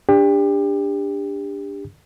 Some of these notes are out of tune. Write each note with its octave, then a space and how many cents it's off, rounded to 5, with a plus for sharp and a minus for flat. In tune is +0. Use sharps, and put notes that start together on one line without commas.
D4 -10 G4 +30